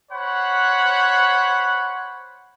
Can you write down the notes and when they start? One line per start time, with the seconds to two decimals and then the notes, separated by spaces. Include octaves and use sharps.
0.11 C5 C#5 F#5 B5